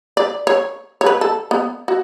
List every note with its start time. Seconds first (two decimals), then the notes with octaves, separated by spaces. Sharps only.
0.17 D5
0.47 C#5
1.01 C#5
1.06 B4
1.21 A4
1.51 B3
1.88 F#4